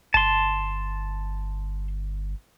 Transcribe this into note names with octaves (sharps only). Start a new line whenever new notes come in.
G1 A5 C6